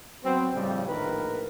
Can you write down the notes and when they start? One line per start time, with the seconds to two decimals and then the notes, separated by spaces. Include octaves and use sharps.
0.23 F#3 B3 C4
0.54 F2 A2 C#3 G3
0.88 A#1 A2 D#3 A#4 B4